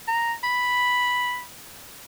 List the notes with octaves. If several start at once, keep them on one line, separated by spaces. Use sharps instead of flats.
A#5
B5